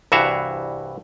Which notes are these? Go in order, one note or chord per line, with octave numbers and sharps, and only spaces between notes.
C2 G2 E3 F#4 E5 F5